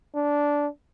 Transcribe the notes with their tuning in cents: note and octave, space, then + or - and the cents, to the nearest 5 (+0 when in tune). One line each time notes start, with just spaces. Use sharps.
D4 -10